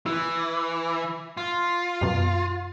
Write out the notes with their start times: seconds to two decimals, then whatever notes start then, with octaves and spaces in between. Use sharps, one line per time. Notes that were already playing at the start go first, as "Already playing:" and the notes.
0.06 E3 E4
1.37 F4
2.01 F#2 B2